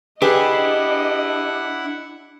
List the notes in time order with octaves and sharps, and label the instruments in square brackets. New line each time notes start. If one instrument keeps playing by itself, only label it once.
[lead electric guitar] D4 [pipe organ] E4 F#5 [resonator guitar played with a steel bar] G4 G#4 B4 [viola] D#5